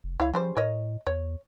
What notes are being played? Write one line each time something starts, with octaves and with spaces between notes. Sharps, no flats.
F1
C#2 E4 C#5 F5
C#3 F3 G3 C5
A2 A#4 C#5 D#5
E2 C#5